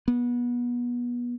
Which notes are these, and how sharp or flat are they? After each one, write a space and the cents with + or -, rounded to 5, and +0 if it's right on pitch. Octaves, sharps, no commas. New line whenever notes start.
B3 -30